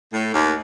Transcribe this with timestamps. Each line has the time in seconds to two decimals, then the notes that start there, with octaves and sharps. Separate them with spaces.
0.12 A2
0.33 D#2